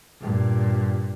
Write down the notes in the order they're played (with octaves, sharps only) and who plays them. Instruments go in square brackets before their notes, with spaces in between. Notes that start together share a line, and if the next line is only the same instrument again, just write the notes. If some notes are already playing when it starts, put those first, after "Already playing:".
[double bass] G2 A#2